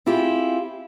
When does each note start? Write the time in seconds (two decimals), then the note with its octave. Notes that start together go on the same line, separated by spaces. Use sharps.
0.06 C4 E4 F4 G4 G#4